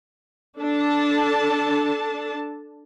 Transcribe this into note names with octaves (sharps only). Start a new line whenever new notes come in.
D4 A4 A5